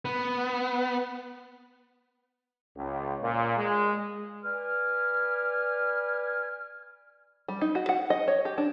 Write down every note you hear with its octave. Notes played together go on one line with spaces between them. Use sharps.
B3
C#2
A#2
G#3
B4 D5 G#5 F6
G3
D#4
F#4
F#5
D#5
C#5
G4
D4